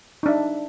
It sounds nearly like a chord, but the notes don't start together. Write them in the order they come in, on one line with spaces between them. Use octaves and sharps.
D#4 D4 E5